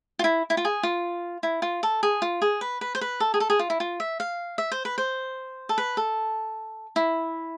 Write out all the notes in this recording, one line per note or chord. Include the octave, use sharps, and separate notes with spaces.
F4
E4
E4
F4
G#4
F4
E4
F4
A4
G#4
F4
G#4
B4
B4
C5
B4
A4
G#4
A4
G#4
F4
E4
F4
E5
F5
E5
C5
B4
C5
A4
B4
A4
E4